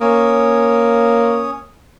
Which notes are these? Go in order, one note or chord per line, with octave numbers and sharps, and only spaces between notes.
A#3 C#4 C#5 D#6